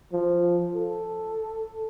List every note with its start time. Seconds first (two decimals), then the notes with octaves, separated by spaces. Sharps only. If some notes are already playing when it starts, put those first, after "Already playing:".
0.13 F3
0.75 A4